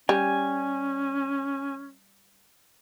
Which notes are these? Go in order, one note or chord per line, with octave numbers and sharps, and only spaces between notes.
G3 C#4 G#5